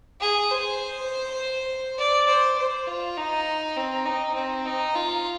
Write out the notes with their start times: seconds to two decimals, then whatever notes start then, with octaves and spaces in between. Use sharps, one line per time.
0.20 G#4
0.50 C5
1.98 D5
2.28 C5
2.58 C5
2.87 F4
3.17 D#4
3.77 C4
4.05 D#4
4.35 C4
4.65 D#4
4.95 F4